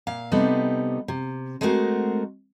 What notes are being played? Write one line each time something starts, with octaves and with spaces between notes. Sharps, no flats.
A#2 F5
C3 G3 B3 C4 D#4 A4
C3
G#3 A3 C4 F#4 A#4